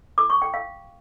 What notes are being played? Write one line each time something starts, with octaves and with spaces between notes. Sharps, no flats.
D6
C#6
G5
F5